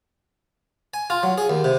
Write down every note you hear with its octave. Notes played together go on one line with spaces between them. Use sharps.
G#5
F4
F#3
G#4
D#2
C3